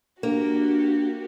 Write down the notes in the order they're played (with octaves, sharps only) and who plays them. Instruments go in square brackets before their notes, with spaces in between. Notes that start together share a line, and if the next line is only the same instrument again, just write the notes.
[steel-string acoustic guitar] A#3 [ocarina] D4 [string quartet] F#4 G4